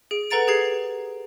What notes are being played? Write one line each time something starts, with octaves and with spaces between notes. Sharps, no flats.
G#4 D7
A4 B4 F#5 A#5 A6 D7
G4 G#4 G#6 C7